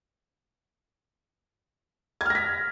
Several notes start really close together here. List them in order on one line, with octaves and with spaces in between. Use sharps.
G#6 F6 A#6 B6